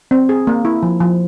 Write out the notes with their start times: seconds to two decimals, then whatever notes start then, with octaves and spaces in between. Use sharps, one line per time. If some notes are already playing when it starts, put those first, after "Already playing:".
0.11 C4
0.29 G#4
0.47 A#3
0.65 E4
0.83 F3
1.00 F3